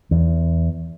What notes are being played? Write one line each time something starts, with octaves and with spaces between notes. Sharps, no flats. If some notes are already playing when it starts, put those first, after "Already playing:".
E2